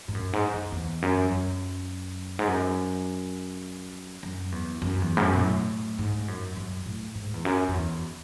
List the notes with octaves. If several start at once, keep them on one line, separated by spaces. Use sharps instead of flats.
G#2
F#2
G#2
F#2
E2
F#2
F#2
G#2
F#2
F#2
E2
F#2
E2
G#2
F#2
B2
A2
G#2
F#2
F#2
A2
G#2
E2
F#2
F#2
E2